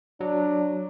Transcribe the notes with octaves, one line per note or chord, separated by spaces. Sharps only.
F#3 D4